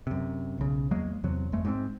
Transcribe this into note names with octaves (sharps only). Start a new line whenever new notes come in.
F#2 C3
B1 C#3
E2 F#3 G#3 A#3
E2 C3 F#3
G1 F2 G#3 A3
G#2 B2 C4